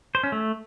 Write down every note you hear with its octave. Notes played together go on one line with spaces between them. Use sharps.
C5
C#4
A3